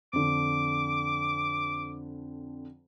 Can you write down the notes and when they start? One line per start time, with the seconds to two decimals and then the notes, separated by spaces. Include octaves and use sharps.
0.13 F2 D3 D6